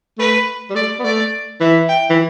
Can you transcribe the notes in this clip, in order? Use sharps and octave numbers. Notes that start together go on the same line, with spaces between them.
A3 B4
G3
A3 D5
B3
A3 D5
E3 E5
G5
E3